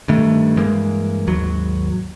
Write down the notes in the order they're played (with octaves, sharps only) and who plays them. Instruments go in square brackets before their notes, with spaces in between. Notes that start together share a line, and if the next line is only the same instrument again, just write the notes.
[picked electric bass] G2 D#3 A3
G2 E3 G#3 A#3
G#1 D#2 F#3